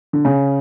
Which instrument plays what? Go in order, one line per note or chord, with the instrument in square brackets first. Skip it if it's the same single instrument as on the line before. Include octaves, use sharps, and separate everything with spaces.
[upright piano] D3
C#3